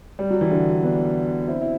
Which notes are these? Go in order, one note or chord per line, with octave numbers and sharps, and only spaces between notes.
G3
F#3
E3
D3 F#3
B3 D4
C4 E4
E4